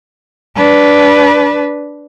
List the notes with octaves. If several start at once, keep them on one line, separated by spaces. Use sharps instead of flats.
D4 B4